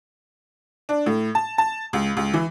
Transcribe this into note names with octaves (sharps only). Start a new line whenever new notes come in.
D4
A2
A5
A5
C#2
C#2
E3